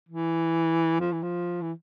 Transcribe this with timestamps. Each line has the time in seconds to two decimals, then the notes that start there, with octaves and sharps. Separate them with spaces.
0.09 E3
1.00 F3
1.12 E3
1.23 F3
1.62 E3